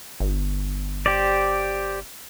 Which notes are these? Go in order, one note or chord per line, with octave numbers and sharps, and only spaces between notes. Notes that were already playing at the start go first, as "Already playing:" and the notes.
G1
G4 C5 D5